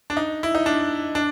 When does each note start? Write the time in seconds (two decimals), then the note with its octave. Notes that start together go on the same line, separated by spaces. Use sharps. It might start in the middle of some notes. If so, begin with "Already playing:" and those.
0.10 D4
0.17 D#4
0.43 E4
0.55 D#4
0.66 D4
1.15 D4